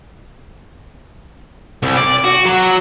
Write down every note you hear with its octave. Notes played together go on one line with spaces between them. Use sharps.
C2
D5
F#4
F#3